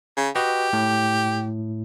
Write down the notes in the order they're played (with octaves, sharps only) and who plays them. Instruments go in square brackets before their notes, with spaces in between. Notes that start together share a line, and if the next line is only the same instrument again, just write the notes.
[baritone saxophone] C#3
[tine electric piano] F#4 B4 D#5 [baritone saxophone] G4
[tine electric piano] A2